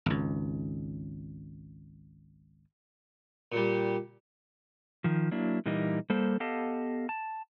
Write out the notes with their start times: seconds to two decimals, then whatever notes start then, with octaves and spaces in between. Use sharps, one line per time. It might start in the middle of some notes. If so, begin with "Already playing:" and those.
0.06 G#1 C#2
3.52 A#2 G3
5.04 D#3 F3
5.31 F#3 A#3 D4 E4
5.66 A#2 E3 G3 A#3 D#4
6.10 G3 A#3 A4 C5
6.40 B3 G4 A4 D#5 F5 A5
7.09 A5